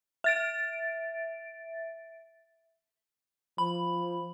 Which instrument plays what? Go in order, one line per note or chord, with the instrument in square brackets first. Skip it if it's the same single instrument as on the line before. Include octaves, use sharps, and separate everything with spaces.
[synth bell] E5 A6 D7
[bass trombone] F3 [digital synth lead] B5